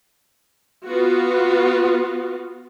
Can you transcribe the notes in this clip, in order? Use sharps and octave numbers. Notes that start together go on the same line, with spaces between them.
B3 F4 F#4